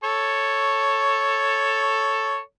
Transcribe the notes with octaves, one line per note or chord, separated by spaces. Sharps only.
A4 C#5